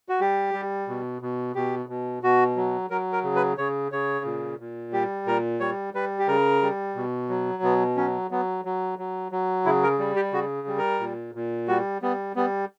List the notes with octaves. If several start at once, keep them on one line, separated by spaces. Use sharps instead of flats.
F#4
G3 G4
G3
B2
B2
B2 G4
B2
B2 F#4
F#3
F#3 A#4
A#4
C#3
B4
C#3 C#5
C#3 C#5
A#2
A#2
G3 G4
A#2 A#4
G3 C#5
G3 B4
G4
C#3 A#4
G3
B2
F#3
B2 B3
F#3 C#4
F#3 B3
F#3
F#3
F#3
C#3 E4
A#4
G3
G4
C#3 F#4
G3
A#4
A#2
A#2
G3 F#4
G3 B3
G3 B3